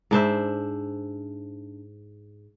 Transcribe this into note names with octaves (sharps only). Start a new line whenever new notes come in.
G#2 D4 C5 E5